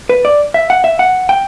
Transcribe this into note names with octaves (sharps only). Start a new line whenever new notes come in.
B4
D5
E5
F#5
E5
F#5
G5